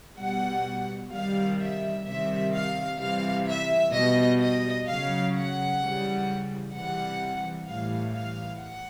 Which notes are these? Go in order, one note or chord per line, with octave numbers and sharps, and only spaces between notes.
B2 G3 F#5
C3 D#3 G3 F5
E5
C3 D#3 G3 E5
F5
C3 E3 G3 F5
E5
B2 G3 D#5
D#5
C#3 F#3 F5
F#5
C#3 E3 G3
C3 E3 G3 F#5
A2 E3 G3 F5
F5
F#5